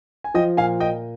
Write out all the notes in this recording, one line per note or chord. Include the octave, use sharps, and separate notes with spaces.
G#5
F3 D#5 G5
A#2 F5 G#5
A#2 D#5 G5